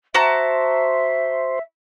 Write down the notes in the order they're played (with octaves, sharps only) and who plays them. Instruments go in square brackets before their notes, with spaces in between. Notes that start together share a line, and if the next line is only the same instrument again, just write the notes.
[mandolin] F#4 A5 A#5 [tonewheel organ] C5 [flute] E5